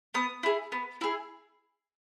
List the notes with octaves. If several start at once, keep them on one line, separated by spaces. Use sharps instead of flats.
B3 D#6
E4 G#4
B3
E4 G#4